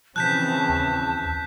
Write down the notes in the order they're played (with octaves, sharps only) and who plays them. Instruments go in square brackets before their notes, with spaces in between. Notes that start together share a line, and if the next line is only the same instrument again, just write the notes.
[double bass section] C#3 E3 C4 [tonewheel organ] F3 [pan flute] A5 [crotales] F#6 G6 B6
[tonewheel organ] D#2 E6